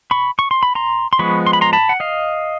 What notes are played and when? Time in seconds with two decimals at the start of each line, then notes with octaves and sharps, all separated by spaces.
0.11 B5 C#6
0.39 C#6
0.51 C6
0.63 B5
0.75 A#5 C6
1.13 C6
1.19 F3 G#3 B3 B5 C#6
1.46 C6
1.53 B5
1.61 A#5 C6
1.73 A5 B5
1.89 F#5
2.00 D#5 F5